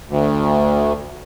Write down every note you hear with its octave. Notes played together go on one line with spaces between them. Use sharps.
D2